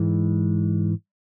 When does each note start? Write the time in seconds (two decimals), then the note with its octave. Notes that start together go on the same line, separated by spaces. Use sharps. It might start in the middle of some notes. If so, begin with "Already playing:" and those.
Already playing: G#2 E3 G#3